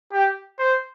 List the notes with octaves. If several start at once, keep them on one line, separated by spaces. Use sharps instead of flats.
G4
C5